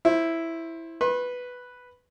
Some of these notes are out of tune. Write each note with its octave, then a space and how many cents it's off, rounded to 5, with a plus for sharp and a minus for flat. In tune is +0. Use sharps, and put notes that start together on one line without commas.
E4 +0 C5 +20
B4 +0 C6 +45